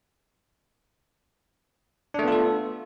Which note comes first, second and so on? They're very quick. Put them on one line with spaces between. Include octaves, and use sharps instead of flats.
D4 A3 B3 F4 A4